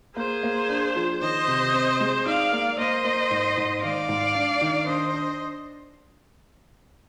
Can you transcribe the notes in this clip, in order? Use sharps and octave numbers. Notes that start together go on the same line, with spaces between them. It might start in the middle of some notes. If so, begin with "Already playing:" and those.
A#3 G#4 C5
A#3
D4
F3
D#3 C5 D#5
C3
C4
G#3
D#4 D5 F5
A#3
A#3 C5 D#5
A#3
G#2
G#2
D#3 D5 F5
G#2
D4
D#3
D4 C5 D#5
D4